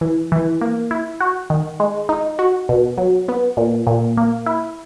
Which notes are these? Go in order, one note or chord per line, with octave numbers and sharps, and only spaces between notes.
E3
E3
A#3
E4
F#4
D#3
G#3
D#4
F#4
B2
F#3
B3
A#2
A#2
A#3
E4